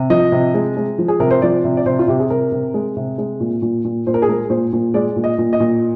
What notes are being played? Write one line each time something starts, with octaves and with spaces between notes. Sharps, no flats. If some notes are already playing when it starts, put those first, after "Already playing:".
Already playing: C3
F3 D#5
C3
G#3
G#3
F3
G#4
C3 A#4
C5
F3 D5
C3
D5
C3 C5
F4
C3 G4
G#4
C3 A#4
C3
G#3
C3
G#3
A#2
A#2
A#2
A#2 C5
A#4
G#4
G#3 A#4
A#2 C5
A#2
G#3 D5
A#2
D#5
A#2
D#5
A#2